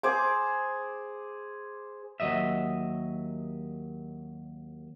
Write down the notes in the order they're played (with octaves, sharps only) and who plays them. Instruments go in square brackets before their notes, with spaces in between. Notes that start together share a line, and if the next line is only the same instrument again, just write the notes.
[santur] G#4 C5 D6
[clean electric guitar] D#2 D#3 F#3 D#5 E5